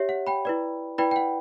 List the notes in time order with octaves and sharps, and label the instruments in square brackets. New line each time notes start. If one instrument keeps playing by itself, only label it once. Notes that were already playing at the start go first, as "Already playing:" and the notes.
Already playing: [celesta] G4 C#5 E5
F#5
G5 B5
E4 B4 D5
E4 B4 D5 G5 B5
G5
F#5